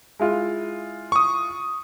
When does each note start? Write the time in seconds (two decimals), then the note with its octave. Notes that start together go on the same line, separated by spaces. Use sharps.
0.19 G#3 E4 F4
1.12 C#6 D#6